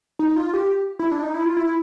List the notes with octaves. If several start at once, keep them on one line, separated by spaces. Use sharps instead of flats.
D#4
F4
G4
E4
D4
D#4
E4
F4
E4